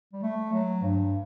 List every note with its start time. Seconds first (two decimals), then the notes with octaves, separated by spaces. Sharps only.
0.13 G3
0.23 A3
0.53 F#3
0.82 G2